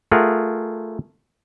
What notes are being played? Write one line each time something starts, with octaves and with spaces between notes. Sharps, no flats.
A3 F4 G#4 A#4 F#5